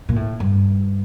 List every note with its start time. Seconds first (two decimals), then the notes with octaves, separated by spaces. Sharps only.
0.09 A#2
0.16 A2
0.40 G2